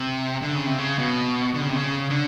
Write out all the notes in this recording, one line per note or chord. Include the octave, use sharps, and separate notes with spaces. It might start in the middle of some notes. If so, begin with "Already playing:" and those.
Already playing: C3
D3
C#3
C3
C#3
B2
D3
C#3
C3
C#3
D3